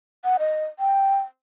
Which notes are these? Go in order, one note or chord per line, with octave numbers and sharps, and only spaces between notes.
F#5
D#5
G5